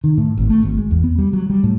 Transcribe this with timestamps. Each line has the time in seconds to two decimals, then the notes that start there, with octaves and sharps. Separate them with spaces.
0.04 D#3
0.18 A2
0.37 G#1
0.50 A3
0.63 G#1
0.77 G#3
0.91 E2
1.04 B3
1.19 G3
1.33 F#3
1.50 G3
1.64 A2